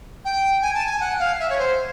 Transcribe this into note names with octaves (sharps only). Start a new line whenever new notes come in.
G5
G#5
A5
G#5
F#5
F5
E5
C#5
C5